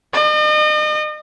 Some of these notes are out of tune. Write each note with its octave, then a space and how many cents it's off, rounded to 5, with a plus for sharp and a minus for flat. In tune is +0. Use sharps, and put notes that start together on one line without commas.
D#5 -40